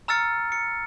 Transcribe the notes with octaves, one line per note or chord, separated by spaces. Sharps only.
A#5 E6 F6 A6 C#7
C#7